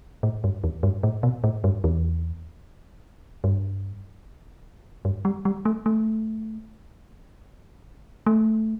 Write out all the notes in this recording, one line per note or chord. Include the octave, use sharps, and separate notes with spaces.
A2
G2
E2
G2
A2
B2
A2
G2
E2
G2
G2
G3
G3
A3
A3
A3